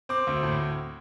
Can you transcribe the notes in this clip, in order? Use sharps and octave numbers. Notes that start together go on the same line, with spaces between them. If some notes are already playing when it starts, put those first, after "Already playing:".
C4 D6
D2
A2